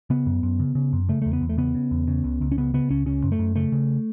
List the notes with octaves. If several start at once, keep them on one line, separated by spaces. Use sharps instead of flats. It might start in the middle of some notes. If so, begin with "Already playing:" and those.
C#3 B3
F#2
F#2
C#3
C#3
F#2
C#3 A3
E2 A3
B3
E2
A3
C#3 B3
C#3
E2
C#3
C#2
C#2
C#4
C#3 B3
C#3 B3
C#2 C#4
C#3 C#4
F#2
A3
F#2
C#3 A3
C#3